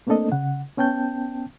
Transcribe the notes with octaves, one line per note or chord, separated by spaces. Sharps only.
A3 A#3 C4 D4 A4 D#5
C#3 F#5
B3 C#4 G5 A5 G6